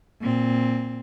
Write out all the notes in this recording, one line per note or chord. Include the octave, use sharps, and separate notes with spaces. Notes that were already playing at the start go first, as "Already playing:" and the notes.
A#2 C4